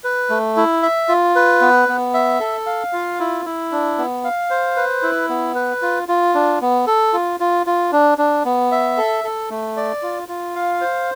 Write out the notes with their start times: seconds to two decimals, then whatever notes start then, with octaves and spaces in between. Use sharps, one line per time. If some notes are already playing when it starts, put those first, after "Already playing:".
0.04 B4
0.30 A3
0.57 E4
0.83 E5
1.09 F4
1.36 B4
1.61 B3
1.88 B3
2.14 E5
2.40 A4
2.66 F5
2.93 F4
3.20 E4
3.46 E4
3.72 D4
3.98 B3
4.24 F5
4.50 C5
4.77 B4
5.03 E4
5.29 B3
5.55 B4
5.82 F4
6.08 F4
6.35 D4
6.61 B3
6.87 A4
7.13 F4
7.40 F4
7.66 F4
7.92 D4
8.18 D4
8.45 B3
8.72 E5
8.97 A4
9.24 A4
9.50 A3
9.77 D5
10.03 F4
10.28 F4
10.55 F5
10.81 C5